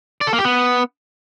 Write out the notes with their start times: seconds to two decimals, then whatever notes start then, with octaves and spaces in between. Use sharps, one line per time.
0.21 D5
0.27 A4
0.33 A#3
0.39 G4
0.45 B3